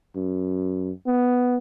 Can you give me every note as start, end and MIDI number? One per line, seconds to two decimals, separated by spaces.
0.16 0.91 42
1.06 1.57 59